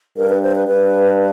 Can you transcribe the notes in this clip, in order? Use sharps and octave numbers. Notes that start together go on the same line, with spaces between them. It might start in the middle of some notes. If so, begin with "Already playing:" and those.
G2 A#4
B4
C5
B4
G2 B4